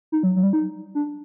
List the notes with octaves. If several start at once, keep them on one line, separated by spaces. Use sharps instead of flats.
D#4
F#3
F#3
G3
D#4
D4